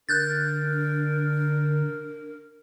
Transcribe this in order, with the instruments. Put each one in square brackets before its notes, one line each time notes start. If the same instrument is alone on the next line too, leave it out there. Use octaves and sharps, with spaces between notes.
[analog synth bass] D3 [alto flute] D4 [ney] A#4 [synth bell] F#6 G6 A6